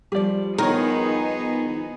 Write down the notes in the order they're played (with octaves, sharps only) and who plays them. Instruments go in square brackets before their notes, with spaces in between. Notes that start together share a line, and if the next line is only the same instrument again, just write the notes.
[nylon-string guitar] F3 G3 [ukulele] G4 D5
[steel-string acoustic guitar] D#3 [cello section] B3 D#4 G#4 [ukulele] A#4 C#5